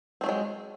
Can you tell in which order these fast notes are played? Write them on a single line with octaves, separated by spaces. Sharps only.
C4 A3 F#3 G#3